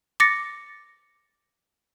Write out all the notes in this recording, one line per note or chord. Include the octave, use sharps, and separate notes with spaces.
D6 A6 A#6 C#7